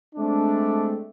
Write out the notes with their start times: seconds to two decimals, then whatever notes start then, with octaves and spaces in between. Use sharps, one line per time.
0.15 G#3 A3 C4 D4